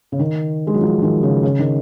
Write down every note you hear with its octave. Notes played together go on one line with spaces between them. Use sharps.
C#3
D#3
G#3
F#3
F3
D#3
C#3
C#3
D#3